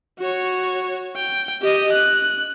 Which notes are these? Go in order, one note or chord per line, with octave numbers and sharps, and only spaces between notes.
F#4 C#5
G5
G4 D#5
F#6